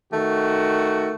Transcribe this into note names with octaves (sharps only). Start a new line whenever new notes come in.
D#3 A3 F#4